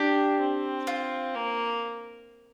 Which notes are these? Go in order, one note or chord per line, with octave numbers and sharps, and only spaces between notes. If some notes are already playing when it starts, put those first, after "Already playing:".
Already playing: D4 G4
C4
F4
A#3